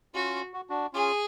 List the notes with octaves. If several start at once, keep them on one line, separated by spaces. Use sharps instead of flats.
C#4 F4 F#4
F#4
D4 F#4
C#4 F4 G#4